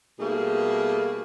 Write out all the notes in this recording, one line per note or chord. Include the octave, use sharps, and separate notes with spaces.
B2 G3 A3 A#3 D#4 G#4